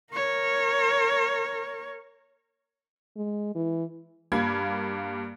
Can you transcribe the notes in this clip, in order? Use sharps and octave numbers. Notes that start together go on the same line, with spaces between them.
A#4 C#5
G#3
E3
G2 A#3 B5 G#6